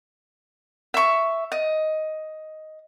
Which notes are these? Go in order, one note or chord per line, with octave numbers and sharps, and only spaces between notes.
E5 C#6
D#5